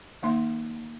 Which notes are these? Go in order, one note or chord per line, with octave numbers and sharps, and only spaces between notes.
D#3 G#3 A#3 D#4 C6